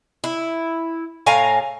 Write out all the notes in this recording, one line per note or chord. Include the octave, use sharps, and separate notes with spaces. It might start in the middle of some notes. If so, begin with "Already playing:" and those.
E4
A2 F5 G#5 A#5